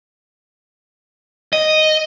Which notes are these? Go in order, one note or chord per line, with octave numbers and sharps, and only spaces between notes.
D#5